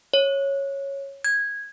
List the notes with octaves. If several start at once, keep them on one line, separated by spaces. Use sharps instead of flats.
C#5
G#6